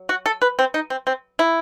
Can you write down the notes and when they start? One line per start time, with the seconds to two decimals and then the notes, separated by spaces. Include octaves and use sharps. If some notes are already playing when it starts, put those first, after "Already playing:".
Already playing: F#3
0.09 F#4
0.26 A4
0.42 B4
0.59 C4
0.74 D#4
0.90 C4
1.07 C4
1.39 E4